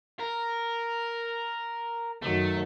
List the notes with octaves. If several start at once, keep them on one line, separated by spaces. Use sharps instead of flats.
A#4
F#2 D#3 F#3 A3